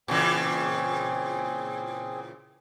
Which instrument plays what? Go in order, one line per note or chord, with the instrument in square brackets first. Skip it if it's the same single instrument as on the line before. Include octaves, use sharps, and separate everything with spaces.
[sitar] A#2 C#3 E3 [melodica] C4 G#4